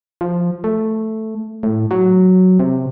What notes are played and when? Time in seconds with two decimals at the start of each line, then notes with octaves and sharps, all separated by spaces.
0.21 F3
0.64 A3
1.63 A2
1.91 F#3
2.60 C3